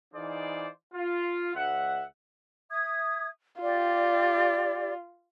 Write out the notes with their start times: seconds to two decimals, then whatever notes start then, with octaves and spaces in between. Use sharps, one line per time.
0.14 E3 D#4 F4 G#4 C5 D5
0.95 F4
1.55 C#2 E5 F#5
2.70 E5 D#6 G#6
3.61 F4 G4 D5